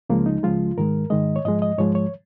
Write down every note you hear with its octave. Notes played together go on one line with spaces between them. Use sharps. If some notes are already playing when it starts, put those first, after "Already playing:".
C#2 C#3 F3 G#3 A#3
D#4
C#2 C#3 F3 G#3 F4
G#2 D#3 G#3 A#4
G#2 D#3 G#3 D#5
C#5
G#2 F3 G#3 D#5
D#5
G#2 F3 G#3 C#5
C#5